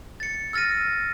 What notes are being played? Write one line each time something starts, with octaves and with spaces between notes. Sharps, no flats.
A6 C#7
E6 F6 A6 A#6 D#7